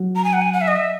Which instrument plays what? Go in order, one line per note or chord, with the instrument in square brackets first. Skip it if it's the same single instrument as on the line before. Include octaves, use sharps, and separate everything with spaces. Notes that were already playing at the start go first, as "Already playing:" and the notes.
Already playing: [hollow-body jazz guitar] F#3
[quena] A#5
G#5
F#5
G#5
F#5
E5
D#5
E5